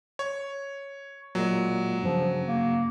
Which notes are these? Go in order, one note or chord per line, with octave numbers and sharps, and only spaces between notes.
C#5
A#2 F#3 G#3
G2 C#3 F3
A#3